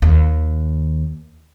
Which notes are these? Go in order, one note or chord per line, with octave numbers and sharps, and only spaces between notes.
D#2